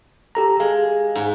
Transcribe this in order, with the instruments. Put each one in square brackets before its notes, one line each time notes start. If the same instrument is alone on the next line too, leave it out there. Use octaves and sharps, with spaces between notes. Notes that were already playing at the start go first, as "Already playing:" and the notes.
[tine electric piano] G4 A4 A#5
[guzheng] G#3 [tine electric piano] F5
[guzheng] G#2